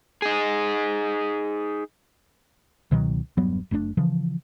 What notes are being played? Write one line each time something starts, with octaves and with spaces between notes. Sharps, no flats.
D#4 G#4
C#2 B2 D#3 F#3
E1 G2 F#3 B3
F#1 A3 C4 D4
C#3 E3 F3